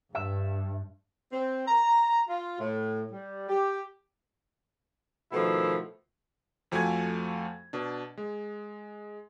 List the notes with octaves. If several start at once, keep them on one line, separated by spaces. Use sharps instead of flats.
G2 E5
C4
A#5
F4
A2
G3
G4
B2 D#3 F3 A3 E4
F2 F3 A3 F#4 G#5 G#6
B2 D4
G#3